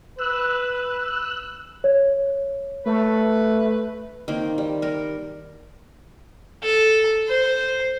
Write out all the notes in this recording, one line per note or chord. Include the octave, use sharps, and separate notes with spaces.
B4 E6 F#6
C#5
A3 B4
D#3 A#3 C4
G3
G3 A#4
A4
C5